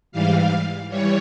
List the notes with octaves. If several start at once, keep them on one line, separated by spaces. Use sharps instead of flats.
G#2 E3 G3 F5
E3 G3 C#5